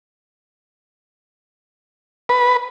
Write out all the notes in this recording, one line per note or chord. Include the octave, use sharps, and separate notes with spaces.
B4